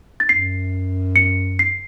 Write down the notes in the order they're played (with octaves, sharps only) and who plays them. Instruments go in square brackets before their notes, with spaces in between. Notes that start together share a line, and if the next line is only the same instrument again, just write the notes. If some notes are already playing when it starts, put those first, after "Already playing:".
[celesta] A6
[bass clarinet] F#2 [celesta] C7
[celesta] C#7
C7